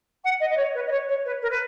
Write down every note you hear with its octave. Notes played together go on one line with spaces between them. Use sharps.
F#5
D#5
D#5
C#5
B4
D#5
C#5
C#5
B4
A#4
B4